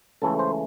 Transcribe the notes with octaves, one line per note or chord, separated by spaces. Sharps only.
C#2 C#3 E3 A3 A4
C5